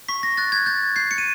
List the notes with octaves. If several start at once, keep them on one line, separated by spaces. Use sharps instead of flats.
C#6 B6
A#6
F#6 A6
G#6
G6 A6
G6 C7
C#7
D#7